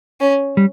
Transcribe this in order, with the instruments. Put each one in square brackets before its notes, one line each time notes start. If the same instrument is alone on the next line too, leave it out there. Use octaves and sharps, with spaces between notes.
[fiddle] C#4
[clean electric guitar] G3